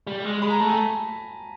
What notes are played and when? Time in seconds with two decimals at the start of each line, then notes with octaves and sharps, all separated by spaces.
0.07 G3
0.25 G#3
0.42 G#3 B5
0.50 A#5
0.60 A3 A5
0.69 G#5